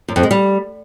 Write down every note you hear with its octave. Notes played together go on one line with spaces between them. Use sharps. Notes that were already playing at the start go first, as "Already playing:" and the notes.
F#2
F2
G#3
G3